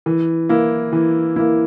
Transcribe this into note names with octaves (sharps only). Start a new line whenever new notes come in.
E3
A#3 E4
E3
A#3 E4